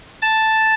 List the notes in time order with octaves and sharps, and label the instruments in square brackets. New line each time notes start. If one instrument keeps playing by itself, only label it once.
[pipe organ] A5